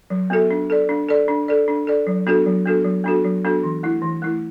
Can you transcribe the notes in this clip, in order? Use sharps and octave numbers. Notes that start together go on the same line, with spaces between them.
F#3
B3 F#4 A4 E5
D4
A4 D5
D4
A4 D5
D4
A4 D5
D4
A4 D5
F#3
B3 D4 F#4 A4
F#3
B3 D4 F#4 A4
F#3
B3 D4 F#4 A4
F#3
B3 D4 F#4 A4
E3
A3 E4
E3
A3 E4